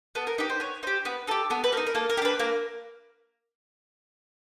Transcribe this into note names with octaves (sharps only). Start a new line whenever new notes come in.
B3 A4
A#4
D#4 G4 B4
C5
B3 C#5
D#4 G4 C5
B3 B4
D#4 G4 A4
B3 A4
B4
D#4 G4 A#4
A#4
A#3 A4
A#4
G4
D4 B4
A#3 A#4